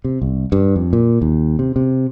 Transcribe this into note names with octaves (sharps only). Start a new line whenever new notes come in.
C3
C2
G2
F2
A#2
D#2
C3
C3